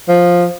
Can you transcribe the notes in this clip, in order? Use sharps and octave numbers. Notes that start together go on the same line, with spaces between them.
F3